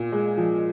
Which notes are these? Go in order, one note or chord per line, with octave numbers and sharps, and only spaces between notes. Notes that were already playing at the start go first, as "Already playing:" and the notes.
Already playing: A#2
G#3
F3